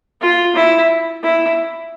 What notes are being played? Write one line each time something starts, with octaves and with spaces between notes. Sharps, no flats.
F4
E4
E4